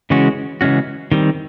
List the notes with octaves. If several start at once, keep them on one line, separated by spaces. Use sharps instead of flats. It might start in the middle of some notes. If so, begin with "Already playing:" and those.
C#3 E3 G#3 C#4 F#4
C#3 E3 G#3 C#4 F#4
D#3 G3 C4